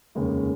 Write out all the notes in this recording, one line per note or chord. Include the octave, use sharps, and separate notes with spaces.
F1 D#2 C#3 G#3 C#4